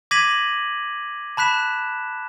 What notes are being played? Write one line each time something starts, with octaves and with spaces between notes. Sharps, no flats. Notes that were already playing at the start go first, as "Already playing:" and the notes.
D6 G#6 A#6 B6 D#7 F#7
A5 B5 F#6 B6 E7